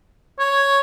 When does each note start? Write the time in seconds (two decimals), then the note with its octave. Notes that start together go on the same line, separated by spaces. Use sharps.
0.39 C#5